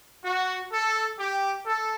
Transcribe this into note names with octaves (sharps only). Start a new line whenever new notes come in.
F#4
A4
G4
A4